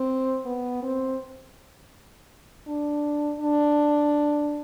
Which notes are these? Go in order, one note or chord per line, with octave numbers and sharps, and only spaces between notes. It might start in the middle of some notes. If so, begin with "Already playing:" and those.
Already playing: C4
B3
C4
D4
D4